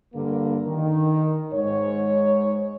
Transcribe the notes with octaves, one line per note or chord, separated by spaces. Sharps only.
G2 D3 A#3
D#3
G#2 C#5